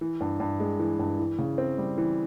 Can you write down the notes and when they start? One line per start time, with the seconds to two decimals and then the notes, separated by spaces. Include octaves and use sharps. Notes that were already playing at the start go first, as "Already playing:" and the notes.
0.01 E3
0.21 G2
0.40 G2
0.60 G#3
0.80 E3
0.99 G2
1.19 E3
1.39 C#3
1.58 C4
1.78 G3
1.98 E3